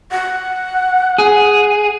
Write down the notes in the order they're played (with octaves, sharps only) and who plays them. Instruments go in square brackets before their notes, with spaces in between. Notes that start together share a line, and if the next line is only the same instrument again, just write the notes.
[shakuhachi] F#5
[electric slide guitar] G#4